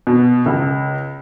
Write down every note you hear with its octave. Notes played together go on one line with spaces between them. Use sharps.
B2
C#2